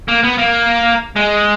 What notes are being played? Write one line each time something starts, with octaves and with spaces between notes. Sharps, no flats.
A#3
B3
A#3
G#3